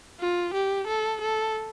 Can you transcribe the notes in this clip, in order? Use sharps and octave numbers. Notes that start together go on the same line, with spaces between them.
F4
G4
A4
A4